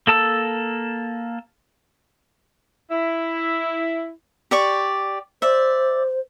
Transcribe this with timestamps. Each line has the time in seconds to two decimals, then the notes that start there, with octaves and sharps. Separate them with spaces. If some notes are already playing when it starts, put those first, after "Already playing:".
0.07 A#3 A4 A5 E6
2.91 E4
4.51 G4 D5 C#6
5.42 C5 D5 E5